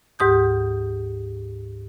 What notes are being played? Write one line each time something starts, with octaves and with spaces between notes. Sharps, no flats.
D2 G#2 G4 D#6 G6